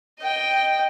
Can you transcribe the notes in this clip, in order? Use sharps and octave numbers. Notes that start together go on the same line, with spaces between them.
D#5 G5